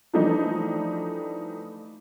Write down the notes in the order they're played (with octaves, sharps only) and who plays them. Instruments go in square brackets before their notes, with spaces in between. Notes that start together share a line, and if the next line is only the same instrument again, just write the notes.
[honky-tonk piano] E3 F3 G3 A3 D4 D#4